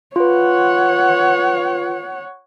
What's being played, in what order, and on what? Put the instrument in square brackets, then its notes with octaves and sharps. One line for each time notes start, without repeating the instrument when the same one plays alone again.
[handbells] F4 B4 [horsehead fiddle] C#5 F#5